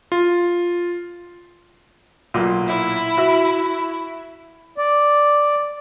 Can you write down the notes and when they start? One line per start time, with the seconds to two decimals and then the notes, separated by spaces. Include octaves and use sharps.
0.12 F4
2.34 B1 A#2
2.68 E4
3.17 F#4 E5
4.78 D5